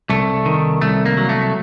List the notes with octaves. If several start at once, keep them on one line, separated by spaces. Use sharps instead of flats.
C2 A3
D#3
C2 A3
A#3
F#3
A3